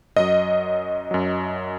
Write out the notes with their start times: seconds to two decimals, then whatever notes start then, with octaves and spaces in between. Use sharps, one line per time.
0.17 F#2 F#3 D#5
1.11 F#2 F#3